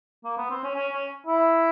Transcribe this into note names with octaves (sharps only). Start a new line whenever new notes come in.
A#3
B3
C4
C#4
C#4
C#4
E4